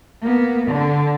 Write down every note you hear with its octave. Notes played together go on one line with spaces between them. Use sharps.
A#3 B3
D3